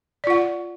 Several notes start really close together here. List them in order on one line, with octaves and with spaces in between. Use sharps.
D5 F4 F#5